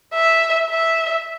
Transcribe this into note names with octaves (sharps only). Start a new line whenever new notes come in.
E5
E5